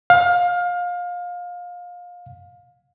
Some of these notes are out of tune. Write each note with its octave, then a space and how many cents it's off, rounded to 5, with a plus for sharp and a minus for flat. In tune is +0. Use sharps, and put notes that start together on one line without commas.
F5 +25